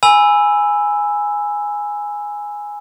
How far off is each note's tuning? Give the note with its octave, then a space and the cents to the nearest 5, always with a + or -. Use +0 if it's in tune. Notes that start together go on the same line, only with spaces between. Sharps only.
G#5 +0 B5 +0 E6 +0